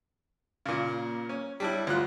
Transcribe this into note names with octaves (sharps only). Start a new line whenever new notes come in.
A#2 C#3
A#3
C#4
G3 D4 E4 C#5
D2 F4 F#6